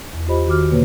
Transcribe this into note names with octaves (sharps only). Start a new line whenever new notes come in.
E2
F4 G4 C5 D#5 B5
D#3 F#4 D6 F6
B2 D3 A#3 B4 C#5